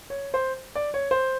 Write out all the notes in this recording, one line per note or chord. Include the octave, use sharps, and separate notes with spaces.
C#5
C5
D5
C#5
C5